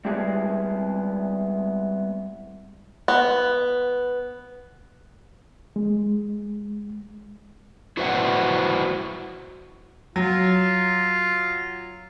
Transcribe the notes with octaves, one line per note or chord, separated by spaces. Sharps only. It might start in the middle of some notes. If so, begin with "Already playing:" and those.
G3 G#3 B3 C4 E4 G#4
B3
G#3
E4 F#4 B4 C5 E5 F#5
F#3 F4